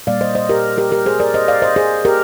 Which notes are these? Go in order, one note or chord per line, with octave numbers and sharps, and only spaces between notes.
A#2 G3 A#3 D5 F5
C5 D#5
C5 D#5
G4 A#4
G4 A#4
G4 A#4
G#4 C5
A#4 D5
C5 D#5
D5 F5
C5 D#5
G#4 C5
G4 A#4